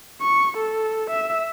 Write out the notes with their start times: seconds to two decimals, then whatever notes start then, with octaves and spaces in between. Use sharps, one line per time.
0.22 C#6
0.57 A4
1.10 E5